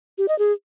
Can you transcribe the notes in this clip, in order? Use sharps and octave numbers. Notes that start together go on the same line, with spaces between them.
G4
D#5
G#4